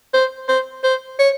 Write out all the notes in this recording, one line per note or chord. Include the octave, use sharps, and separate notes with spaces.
C5
C5
C5
C#5